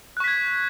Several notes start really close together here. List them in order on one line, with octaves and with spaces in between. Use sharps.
F#6 C#6 B6 G#6